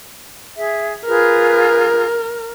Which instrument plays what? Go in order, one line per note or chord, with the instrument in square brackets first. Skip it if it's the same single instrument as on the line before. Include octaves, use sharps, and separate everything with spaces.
[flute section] G#4 E5
[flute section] F4 G#4 B4 [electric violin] A#4